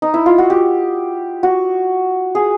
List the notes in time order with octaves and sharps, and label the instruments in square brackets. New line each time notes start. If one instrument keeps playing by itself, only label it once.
[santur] D#4
E4
F4
F#4
G4
F#4
G#4